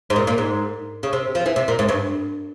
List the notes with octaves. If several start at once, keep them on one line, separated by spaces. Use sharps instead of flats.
G#2
A#2
A#2
G#2
C#3
C3
F3
E3
C3
A#2
G#2
G2